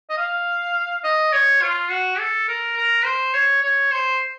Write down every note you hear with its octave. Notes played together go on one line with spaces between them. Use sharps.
D#5
F5
D#5
C#5
F4
F#4
A4
A#4
A#4
C5
C#5
C#5
C5